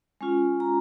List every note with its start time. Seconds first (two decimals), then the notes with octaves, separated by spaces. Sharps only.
0.21 G#3 C#4 F4
0.60 A#5